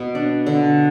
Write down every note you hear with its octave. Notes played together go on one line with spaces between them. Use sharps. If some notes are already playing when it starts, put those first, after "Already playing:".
Already playing: B2
D4
D3